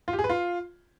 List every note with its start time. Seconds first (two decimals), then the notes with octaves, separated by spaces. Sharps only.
0.08 F4
0.13 G4
0.19 G#4
0.24 B4
0.29 F4